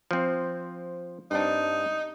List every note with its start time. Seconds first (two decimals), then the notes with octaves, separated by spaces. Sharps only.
0.11 F3 C4
1.31 G2 C4 D4 D#4